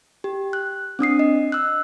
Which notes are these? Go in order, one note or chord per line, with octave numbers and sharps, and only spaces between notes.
G4
F#6
C4 D4 D#6 C7
D#5
E6 F#6